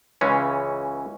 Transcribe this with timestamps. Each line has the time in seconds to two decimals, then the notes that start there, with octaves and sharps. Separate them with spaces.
0.21 C#2 C#3 E3 G#3 C#4